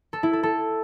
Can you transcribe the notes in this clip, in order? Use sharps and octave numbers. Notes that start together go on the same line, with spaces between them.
A4
E4
A4
A4